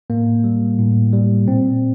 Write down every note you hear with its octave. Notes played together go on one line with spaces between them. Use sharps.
A2 A#3
G3
A2
G3
A#2 C4